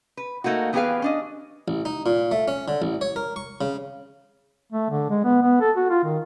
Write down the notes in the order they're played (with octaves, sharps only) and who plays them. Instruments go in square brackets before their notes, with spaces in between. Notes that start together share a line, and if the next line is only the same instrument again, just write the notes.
[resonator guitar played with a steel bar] B4
A3 A#3 D#4 F#4
E3 B3 G4 G#4 B4 F5
C#4 D4 D#5
[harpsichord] A1
D#4
A#2
A3
C#4
D3
A1
C#5
A#4
C#6
C#3
[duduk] A3
D3
G#3
B3
B3
A4
F#4
F4
D#3